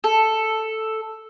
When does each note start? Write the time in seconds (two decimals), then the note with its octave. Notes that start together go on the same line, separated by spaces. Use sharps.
0.04 A4